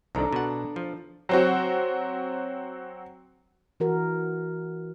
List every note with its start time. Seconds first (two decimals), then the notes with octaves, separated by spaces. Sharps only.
0.15 C2 D#3 D4 A4 A#5
0.33 B2 F#5
0.76 F3
1.29 F#3 C4 F#4
3.80 E3 F#4 A#4